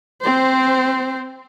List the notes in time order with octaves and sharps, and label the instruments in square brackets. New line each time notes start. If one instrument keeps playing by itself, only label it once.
[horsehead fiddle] C4 C5